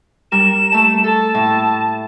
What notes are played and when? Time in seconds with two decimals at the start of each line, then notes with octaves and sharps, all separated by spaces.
0.32 G3 A#4 E7
0.72 A3 A5
1.04 A4 A5
1.35 A2